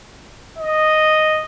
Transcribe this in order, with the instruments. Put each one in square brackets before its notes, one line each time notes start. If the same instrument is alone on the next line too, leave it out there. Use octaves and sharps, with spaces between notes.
[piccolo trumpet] D#5